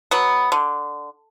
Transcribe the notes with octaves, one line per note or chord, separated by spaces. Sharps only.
F#3 B3
D3